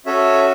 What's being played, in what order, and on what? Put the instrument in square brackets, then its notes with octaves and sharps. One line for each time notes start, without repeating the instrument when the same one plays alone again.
[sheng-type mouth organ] C#4 F#4 A4 C#5 E5